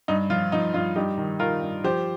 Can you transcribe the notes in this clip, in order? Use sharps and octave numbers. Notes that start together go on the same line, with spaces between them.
G2 D#4
F3 F4
F3 D#4
G2 F4
G2 D#4 G4
D#3
D#3 F4 A#4
G2
F3 G4 C5